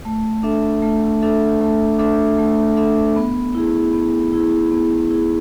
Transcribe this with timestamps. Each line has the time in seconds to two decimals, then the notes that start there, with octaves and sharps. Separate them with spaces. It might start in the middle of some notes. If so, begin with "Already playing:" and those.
0.05 A3
0.43 D4 A4 E5
0.82 A3
1.22 D4 A4 E5
1.61 A3
1.99 D4 A4 E5
2.38 A3
2.77 D4 A4 E5
3.16 B3
3.55 E4 G#4
3.93 B3
4.33 E4 G#4
4.72 B3
5.11 E4 G#4